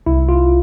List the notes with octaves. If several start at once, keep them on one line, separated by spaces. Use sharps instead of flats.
C2 E4
F4